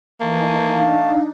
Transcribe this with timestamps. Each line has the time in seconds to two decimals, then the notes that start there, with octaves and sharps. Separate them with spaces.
0.21 E3 A3 A#3 D#4 G#5 A5
0.73 D4 D#4 F5